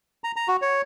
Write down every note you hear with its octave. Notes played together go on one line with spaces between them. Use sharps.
A#5
A#5
F#4
C#5